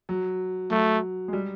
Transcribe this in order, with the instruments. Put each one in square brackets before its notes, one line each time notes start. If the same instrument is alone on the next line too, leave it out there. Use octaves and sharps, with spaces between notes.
[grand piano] F#3
[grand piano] F#3 [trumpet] A3
[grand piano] G#3
G3